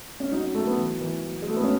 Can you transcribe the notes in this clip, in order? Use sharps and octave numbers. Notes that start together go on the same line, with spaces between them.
C#4
F#3 D#4
C#4
F#3 A3
B3
E3
E3
F#3
G#3
F#3 A3
B3
C#4